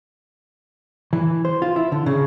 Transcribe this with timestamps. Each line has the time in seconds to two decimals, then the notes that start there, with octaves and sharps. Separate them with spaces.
1.13 E3
1.45 C5
1.62 F4
1.76 E4
1.92 D3
2.06 C#3